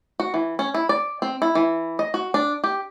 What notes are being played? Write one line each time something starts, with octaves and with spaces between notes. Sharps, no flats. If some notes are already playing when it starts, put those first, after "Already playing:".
F#4
E3
C#4
E4
D5
C4
E4
E3
D#5
F#4
D4
G4